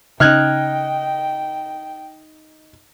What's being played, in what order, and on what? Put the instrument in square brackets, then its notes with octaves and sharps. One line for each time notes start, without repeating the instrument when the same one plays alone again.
[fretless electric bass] C#3 C#4 [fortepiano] D#4 [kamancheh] G5 [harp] F6 F#6 G#6